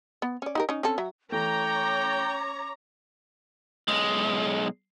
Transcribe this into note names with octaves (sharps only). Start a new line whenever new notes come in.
B3
C#4 D5
D#4 G4 A#4
C#4 D#4
C4 C#4 A4
F#3 E5
E3 A3 C#4 C#5 G5 A#5 D6
B1 G#3